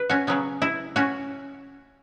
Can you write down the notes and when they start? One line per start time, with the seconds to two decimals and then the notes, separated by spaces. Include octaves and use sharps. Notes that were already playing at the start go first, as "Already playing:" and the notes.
Already playing: B4
0.10 C#4 F#4
0.27 C#3 F#3 B3 C#4
0.62 E4
0.96 C#4 F#4